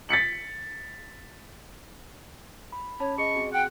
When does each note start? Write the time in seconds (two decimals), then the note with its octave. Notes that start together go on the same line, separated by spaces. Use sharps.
0.09 A6 B6 C#7 F#7
2.72 B5
3.00 C#4 C#5 A5 B5
3.18 G#4 D#5 C#6
3.34 C4 F#4 G#4
3.53 F#5 G5